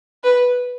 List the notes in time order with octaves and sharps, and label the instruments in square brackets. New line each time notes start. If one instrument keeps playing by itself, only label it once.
[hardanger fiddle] B4